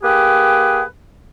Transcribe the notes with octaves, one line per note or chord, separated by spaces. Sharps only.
A#3 G4 G#4 B4 G5